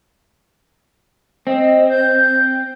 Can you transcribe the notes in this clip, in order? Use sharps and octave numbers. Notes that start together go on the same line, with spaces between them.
C4 D#5
G6